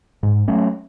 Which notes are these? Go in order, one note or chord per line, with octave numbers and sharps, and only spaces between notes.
G#2
F#3 A3 C#4